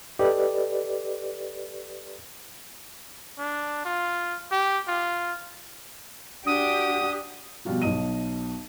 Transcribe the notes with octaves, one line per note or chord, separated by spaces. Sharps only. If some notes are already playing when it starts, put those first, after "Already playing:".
G4 A4 B4 D5 D#5
D4
F4
G4
F4
D4 F#4 G4 D#6
B2 F3 G3 F4 F#4
B1 B2 D#5 D#7